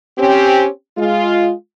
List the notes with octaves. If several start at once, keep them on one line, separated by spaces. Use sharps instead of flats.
C4 C#4 G4
G#3 F4